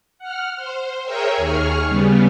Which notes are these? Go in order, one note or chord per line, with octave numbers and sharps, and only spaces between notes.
F#5 F6
C5
G#4 A#4 C#5 E5 G5
D#2 G#4 C#6 F6
C#3 G3 B3